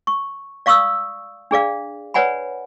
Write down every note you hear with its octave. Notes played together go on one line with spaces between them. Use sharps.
C#6
D5 F5 C#6 D#6 E6
D4 G#4 D5 F5
B4 C#5 D5 F#5 G#5 B5